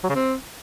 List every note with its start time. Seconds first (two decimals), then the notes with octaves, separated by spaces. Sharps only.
0.03 F#3
0.09 C#3
0.15 C4